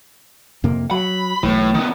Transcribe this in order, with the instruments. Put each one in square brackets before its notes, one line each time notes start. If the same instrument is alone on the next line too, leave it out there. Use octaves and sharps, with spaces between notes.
[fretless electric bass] F2 C3 A#3
[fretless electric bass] F#3 [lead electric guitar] B5
[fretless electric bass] B1 E3 [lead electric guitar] A2
[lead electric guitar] D#3 B3